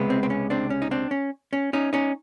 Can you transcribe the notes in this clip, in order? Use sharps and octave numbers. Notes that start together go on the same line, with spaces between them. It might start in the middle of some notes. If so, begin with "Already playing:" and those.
Already playing: C#2 C3 G#3 B3
C4
C4
C#4
C4 D4
C#4
D#4
C4 D4
C#4
C#4
C#4 D#4
C#4 D#4